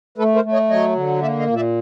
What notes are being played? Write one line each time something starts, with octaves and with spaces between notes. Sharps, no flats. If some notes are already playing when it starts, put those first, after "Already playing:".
A3 A4 B4
A#4 C5
A3
C#5 D#5
F#3 C#5 D#5
D3
A#3 D5 E5
D#5 F5
A#2
D5 E5